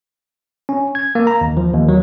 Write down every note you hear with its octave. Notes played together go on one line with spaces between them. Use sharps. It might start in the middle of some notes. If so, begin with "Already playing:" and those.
C#4
G#6
A#3
A#5
D#2
F3
D#2
F#3